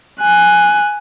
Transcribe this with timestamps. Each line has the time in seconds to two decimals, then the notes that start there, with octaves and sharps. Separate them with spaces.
0.20 G#5 F#6